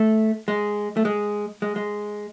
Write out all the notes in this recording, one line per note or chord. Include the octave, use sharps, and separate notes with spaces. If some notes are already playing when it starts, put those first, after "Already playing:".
Already playing: A3
G#3
A3
G#3
G#3
G#3